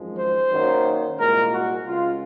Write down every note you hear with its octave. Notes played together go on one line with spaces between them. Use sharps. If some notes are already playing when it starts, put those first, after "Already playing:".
Already playing: G#1 F#2 F3 G#3
C5
F#2 D#3 F#3 A#3
C2 A#2 G#3 A#4
F#4
C#2 C#3 G#3 F4